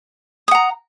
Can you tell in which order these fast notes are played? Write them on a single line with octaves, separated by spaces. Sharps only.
D#6 F#5 A#5